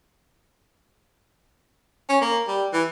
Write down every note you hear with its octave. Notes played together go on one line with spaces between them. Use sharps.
C#4
A#3
G3
E3